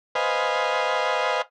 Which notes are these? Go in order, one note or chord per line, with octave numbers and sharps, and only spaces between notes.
B4 C5 D#5 F5 G#5